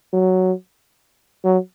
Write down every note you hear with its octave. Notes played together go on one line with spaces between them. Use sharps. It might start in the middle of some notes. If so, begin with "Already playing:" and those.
F#3
F#3